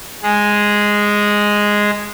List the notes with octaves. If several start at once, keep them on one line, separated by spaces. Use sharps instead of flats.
G#3 G#4